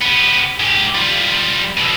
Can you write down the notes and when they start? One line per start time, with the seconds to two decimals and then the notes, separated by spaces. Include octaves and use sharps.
0.02 B3 G4
0.60 G#2 G4
0.95 G3 F4
1.77 B2 D3